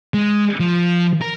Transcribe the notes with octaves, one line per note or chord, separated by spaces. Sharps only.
G#3
F3
A#4